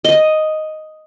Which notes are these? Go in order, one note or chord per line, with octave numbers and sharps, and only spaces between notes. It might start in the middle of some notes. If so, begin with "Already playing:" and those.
D#5